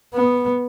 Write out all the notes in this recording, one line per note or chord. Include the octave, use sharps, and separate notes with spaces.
B3